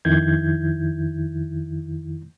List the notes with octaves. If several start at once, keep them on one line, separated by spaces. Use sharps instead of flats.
F2 D#3 E4 G6 G#6